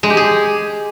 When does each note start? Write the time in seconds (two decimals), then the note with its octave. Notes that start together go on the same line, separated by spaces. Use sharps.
0.03 G#3
0.10 G4
0.17 G#4